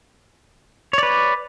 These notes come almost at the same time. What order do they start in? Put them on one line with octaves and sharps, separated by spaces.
C#5 D5 B4